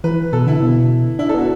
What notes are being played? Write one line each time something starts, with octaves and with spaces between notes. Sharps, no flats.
E3 B4
B2 A4
D3 E4
B2
D4 E4
D4 A4
B3 F#4